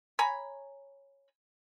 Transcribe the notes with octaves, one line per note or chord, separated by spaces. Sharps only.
C#5 G#5 A#5 B5